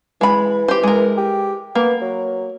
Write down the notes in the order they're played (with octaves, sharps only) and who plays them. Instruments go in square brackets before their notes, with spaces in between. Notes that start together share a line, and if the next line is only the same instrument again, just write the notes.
[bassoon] E3 [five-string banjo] G#3 B5
[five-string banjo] G4 C5
G#3 A#4
[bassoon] G4
[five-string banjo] A#3 [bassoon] B3
[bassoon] F#3